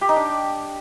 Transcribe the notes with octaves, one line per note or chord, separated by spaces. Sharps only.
G4
D#4
D4